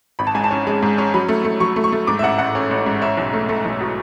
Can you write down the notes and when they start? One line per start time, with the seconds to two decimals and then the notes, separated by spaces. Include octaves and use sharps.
0.19 G#1 B5
0.27 A5
0.35 G#2 G#5
0.44 A5
0.51 C#4
0.67 G#3
0.82 G#2
0.98 C#4
1.14 F#3 B5
1.28 A3
1.45 A3
1.60 F#3 C#6
1.76 A3
1.84 C#6
1.92 A3
2.07 G#2 D6
2.19 E5
2.23 A1 F#5
2.38 A1 F#5
2.55 C#4
2.71 A1
2.86 G#2
3.02 C#4 E5
3.18 B1
3.33 A3
3.49 A3
3.65 B1
3.81 B2